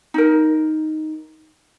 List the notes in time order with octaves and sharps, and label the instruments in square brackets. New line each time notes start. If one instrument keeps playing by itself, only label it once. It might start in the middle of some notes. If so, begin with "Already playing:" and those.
[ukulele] D#4 A#4